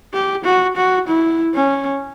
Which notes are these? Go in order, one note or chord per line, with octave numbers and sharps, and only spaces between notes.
G4
F#4
F#4
E4
C#4